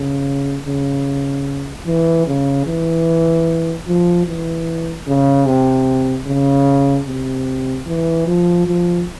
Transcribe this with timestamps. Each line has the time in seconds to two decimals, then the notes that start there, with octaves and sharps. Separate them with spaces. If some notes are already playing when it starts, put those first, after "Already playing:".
Already playing: C#3
0.66 C#3
1.87 E3
2.27 C#3
2.66 E3
3.87 F3
4.27 E3
5.07 C#3
5.46 C3
6.27 C#3
7.07 C3
7.86 E3
8.27 F3
8.66 F3